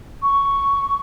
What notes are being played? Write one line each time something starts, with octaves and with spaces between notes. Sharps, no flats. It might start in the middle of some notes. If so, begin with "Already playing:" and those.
C#6